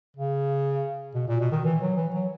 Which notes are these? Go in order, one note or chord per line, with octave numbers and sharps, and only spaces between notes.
C#3
B2
A#2
B2
D#3
E3
F#3
E3
F#3